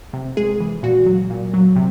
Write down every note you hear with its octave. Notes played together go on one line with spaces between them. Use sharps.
C3
G#3 G#4
E3
A#2 F#4
F#3
A#2
F#3
C3